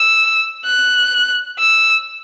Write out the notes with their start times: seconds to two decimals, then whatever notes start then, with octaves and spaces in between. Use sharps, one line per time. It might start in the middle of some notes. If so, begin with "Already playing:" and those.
Already playing: E6
0.66 F#6
1.59 E6